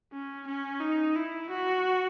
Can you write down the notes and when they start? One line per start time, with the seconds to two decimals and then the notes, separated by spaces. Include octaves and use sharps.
0.12 C#4
0.47 C#4
0.81 D#4
1.16 E4
1.50 F#4